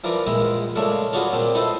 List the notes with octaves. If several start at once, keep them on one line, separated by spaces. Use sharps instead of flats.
E3 F3 A#4 B4 D5 A#5
A#1 A#2 G#3 A#4 B4 E5
C#3 G#3 A3 D4 A4 A#4
C#4 D4 F4 F#4 G#4 B4
A#2 C4 D4
D#4 E4 A4 B4 C5 D#5